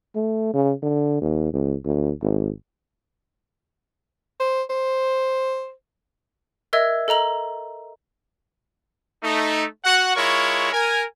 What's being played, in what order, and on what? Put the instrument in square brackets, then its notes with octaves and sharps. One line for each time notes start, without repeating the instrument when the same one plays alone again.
[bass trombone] A3
C#3
D3
D#2
C#2
D2
G#1
[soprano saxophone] C5
C5
[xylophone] A#4 D#5 E5 E6 G#6
A4 D#5 A#5 F#7
[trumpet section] A3 D#4
F#4 F#5
G#3 E4 F4 A#4 C#5 C#6
A#4 G#5